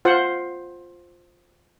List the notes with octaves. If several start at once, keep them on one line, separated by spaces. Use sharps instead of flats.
F4 C5 F#5